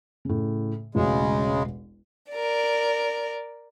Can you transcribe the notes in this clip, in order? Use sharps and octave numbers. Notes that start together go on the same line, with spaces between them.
A2 C#3
E1 A1 C#3 G#3 F#4
A#4 D5